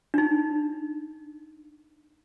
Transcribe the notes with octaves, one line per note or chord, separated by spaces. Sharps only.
D4 D#4